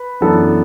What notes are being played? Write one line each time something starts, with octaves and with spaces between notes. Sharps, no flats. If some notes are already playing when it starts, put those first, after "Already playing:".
Already playing: B4
F#2 E3 B3 D4 A4